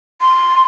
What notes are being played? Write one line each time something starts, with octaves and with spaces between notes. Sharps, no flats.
C6